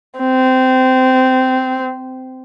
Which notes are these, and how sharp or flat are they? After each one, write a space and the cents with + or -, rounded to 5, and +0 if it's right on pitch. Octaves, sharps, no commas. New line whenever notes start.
C4 -20